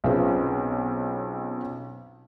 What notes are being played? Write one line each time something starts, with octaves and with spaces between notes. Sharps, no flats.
B1 C4 C#4 F4 G#4 B4